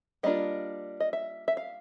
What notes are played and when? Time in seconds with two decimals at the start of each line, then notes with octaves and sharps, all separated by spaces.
0.23 G3 A#3 D4 F4 D#5
1.00 D#5
1.13 E5
1.48 E5
1.57 F5